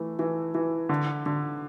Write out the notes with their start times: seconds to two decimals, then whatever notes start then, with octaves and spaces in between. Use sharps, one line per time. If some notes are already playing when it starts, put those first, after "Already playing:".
Already playing: E3 A3
0.19 E3
0.55 E3
0.89 D3
1.26 D3